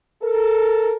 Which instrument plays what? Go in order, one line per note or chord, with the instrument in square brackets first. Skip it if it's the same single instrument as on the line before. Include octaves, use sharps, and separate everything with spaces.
[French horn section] A4 A#4